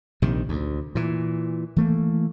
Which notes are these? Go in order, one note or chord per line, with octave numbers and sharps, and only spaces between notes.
A#1 C3 D#3
D2
A#2 E3
E3 A3 A#3